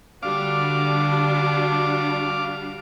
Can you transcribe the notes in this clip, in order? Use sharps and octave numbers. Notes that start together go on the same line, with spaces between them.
D3 G3 D4 F#4 F5 D6